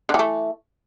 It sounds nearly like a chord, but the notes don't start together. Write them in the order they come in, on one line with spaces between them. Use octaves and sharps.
D3 E3 A3